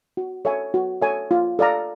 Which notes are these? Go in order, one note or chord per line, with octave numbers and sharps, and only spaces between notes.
F#4
A4 C#5 E5 G#5
F#4
A4 C#5 E5 G#5
F4
A4 D5 F5 A#5